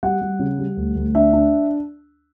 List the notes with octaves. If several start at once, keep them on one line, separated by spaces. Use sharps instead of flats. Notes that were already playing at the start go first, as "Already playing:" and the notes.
G3 F#5
G3
C#3
G3
D2
D2
D4 E5
D4